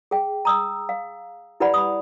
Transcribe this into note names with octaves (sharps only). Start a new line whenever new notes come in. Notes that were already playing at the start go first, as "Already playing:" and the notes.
G#4 G5
A#5 D#6 E6
F5
E4 G4 B4 D5 F#5 B5
B5 D#6